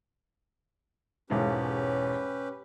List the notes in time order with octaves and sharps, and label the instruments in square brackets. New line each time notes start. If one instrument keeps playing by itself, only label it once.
[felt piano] E1 G#2 [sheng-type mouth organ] C#4 G4 B4